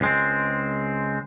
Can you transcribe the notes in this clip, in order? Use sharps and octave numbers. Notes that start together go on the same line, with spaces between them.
C#2 G#3 C4